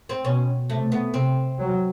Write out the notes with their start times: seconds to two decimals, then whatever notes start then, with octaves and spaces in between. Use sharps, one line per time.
0.09 C4
0.25 B2 C#4
0.69 C3 A3
0.92 B3
1.14 C3 C4
1.59 F#3